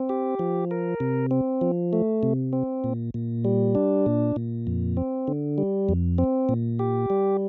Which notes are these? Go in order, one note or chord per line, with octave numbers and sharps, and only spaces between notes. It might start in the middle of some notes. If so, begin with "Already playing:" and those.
Already playing: C4
G4
F3
A#4
C3
C4
F3
A3
C3
C4
A#2
A#2
G3
D4
A#2
A#2
F2
C4
D3
G3
F2
C4
A#2
G4
G3